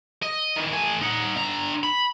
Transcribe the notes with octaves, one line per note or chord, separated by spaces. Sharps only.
D#5
D#3 E3
A3 G#5
D#4 F#5
D3 A#5
B5